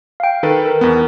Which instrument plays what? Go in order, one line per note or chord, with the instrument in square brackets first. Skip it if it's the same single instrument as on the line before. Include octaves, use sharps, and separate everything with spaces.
[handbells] F5 G5
[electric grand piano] D#3 A4 B4
[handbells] A#4
[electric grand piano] E2 B3